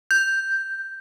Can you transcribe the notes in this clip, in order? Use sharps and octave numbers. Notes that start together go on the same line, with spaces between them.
G6